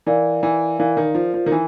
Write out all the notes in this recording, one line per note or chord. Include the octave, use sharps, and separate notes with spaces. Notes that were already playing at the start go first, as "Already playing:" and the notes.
E3 A#4 D5 F5
E3
E3 A#4 D5 F5
D#3
F3
F3
D#3
E3 A#4